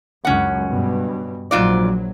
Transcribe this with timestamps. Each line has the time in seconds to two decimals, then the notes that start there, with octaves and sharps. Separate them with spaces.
0.25 C#2 F#2 C#4 F#5
0.69 G2 B2
1.51 A#1 G#2 F#3 F4 D5